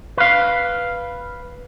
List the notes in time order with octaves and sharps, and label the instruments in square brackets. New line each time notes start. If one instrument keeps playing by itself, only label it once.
[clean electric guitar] B4 F5